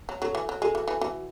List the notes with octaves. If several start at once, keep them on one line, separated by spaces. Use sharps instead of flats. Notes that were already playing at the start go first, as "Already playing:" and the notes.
F#3
F#3 F#4 A4
E3
F#3
G#3 F#4 A4
E3
E3
E3 F#4